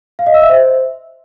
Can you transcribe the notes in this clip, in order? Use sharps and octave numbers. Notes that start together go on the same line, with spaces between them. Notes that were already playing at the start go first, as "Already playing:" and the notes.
F5
D#5
E6
E5
C5